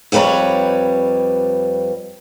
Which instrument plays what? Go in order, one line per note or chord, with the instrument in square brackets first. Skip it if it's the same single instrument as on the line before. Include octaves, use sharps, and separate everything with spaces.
[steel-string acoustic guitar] F2 G3 B4 C#5 A#5